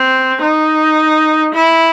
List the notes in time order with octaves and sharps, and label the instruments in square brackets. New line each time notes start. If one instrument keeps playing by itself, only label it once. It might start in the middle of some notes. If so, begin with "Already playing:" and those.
Already playing: [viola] C4
D#4
E4